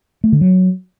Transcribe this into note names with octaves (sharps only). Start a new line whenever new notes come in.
A3
D3
F#3